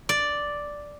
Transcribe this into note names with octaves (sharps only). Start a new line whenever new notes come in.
D5